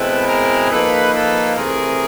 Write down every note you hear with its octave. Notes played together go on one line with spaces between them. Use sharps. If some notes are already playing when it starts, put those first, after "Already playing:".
Already playing: B2 G#3 C4 E4 A4 B4
G#4 A#4
F3 A#3 D#4 A4 B4
A4 B4
C3 E3 A3 G#4 A#4